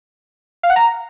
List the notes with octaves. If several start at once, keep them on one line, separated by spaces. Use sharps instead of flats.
F5
F#5
A#5